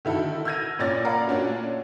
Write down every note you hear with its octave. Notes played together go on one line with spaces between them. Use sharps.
D3 D#3 E4 F#4 A4
E6 F6 G6 G#6 A#6 D#7
A1 A#2 C#4 D5 A6 A#6
A#4 D5 F5 F#5 A#5 B5
A#2 A3 C#4 D4 F#4